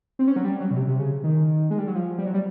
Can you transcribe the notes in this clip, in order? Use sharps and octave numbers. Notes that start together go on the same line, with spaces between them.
C4
C#4
F#3
G3
F#3
B2
C3
C3
C#3
D#3
G#3
G3
F#3
F3
G3
F#3
G3